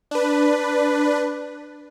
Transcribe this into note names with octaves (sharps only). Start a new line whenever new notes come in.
D4 B4